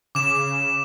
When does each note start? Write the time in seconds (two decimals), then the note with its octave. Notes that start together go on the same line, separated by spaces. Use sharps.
0.15 C#3 D6 E7